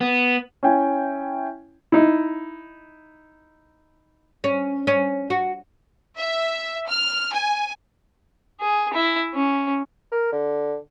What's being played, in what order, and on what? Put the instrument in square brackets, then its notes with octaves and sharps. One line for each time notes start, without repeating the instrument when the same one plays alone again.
[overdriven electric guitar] B3
[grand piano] C#4 E4 G5 G#5
[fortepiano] D#4 E4
[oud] C#4
C#4
F#4
[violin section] E5
F6
G#5
[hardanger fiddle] G#4
E4
C#4
[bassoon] A#4
D3